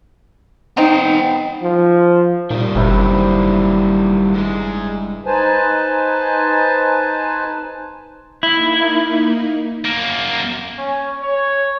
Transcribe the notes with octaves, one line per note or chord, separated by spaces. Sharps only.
B3 C4 D#4 G5
F3
A#2 D#3 G3
F#1 G2 C3 E4
G#2 G#3
D#4 B4 C5 G#5 A5
A#3 D#4 E4
F#2 A#3
C#4
C#5